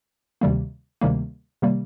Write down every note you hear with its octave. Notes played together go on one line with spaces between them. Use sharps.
D2 C3 D#3 G3 A#3
D2 C3 D#3 G3 A#3
C3 D#3 G3 A#3